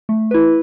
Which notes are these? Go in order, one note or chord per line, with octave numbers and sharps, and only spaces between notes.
A3
E4 B4